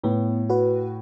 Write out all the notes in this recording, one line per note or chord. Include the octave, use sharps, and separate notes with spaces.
A2 B3
F#4 B4